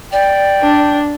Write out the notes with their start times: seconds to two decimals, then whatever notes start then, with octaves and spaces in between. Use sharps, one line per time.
0.12 D5 G5
0.63 D4